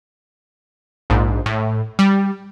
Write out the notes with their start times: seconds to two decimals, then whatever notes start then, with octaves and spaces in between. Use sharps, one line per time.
1.10 A#1 G#2
1.46 A2
1.99 G3